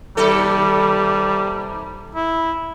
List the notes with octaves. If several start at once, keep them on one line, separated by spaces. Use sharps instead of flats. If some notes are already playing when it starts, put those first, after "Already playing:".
D#2 C3 G3 A4
E4